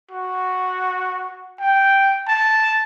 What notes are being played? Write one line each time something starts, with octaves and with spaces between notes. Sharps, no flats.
F#4
G5
A5